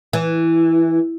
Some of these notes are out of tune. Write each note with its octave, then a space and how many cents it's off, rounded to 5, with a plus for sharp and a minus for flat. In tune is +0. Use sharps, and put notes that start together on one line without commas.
E3 +0